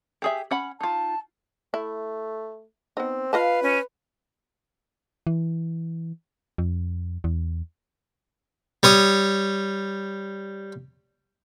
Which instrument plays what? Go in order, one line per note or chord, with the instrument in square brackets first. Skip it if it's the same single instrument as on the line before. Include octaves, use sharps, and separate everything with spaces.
[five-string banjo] G4 G#4 E5
C#4 F#5 B5
[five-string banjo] D#4 F4 [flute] A5
[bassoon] A3 [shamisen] E4
[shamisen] B3 D#4 [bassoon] C4
[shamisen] F4 D#5 A5 [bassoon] B4 [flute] F5
[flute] C#4
[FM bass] E3
F2
E2
[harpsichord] G3 C#5 D#6